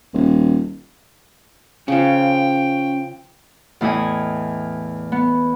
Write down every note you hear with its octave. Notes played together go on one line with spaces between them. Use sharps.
D#1
C#3 F3 C#4 C#5 G5
E2 A2 E4 D#5 G#5
B3